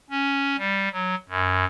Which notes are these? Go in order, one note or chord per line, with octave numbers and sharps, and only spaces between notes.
C#4
G3
F#3
F#2